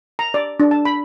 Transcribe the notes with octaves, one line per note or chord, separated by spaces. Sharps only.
A#5
D5
D4
A5
B5